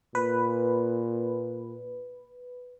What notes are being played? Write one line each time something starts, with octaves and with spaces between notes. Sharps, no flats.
A#2 B4